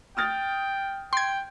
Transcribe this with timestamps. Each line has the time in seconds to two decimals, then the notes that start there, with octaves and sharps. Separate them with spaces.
0.17 G5 D#6 F6 A6
1.13 G5 C6 G#6